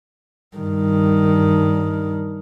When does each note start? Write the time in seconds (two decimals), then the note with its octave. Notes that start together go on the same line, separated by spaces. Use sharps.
0.57 G2 D#3